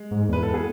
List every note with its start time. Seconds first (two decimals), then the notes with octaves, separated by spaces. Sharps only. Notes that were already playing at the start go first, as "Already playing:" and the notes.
Already playing: G#3
0.11 G#2
0.29 E2 B4
0.43 E2 A4
0.54 G#4